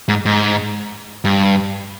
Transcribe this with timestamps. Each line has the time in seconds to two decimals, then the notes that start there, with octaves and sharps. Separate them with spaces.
0.09 G#2
0.26 G#2
1.25 G2